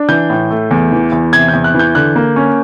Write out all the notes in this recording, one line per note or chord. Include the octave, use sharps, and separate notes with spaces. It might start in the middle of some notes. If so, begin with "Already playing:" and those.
Already playing: D4
E3 G6
A2
A3
E2
E3
E2
C3 G#6
G6
E2
F#6
E3
G6
D3 F#6
A#3
C#4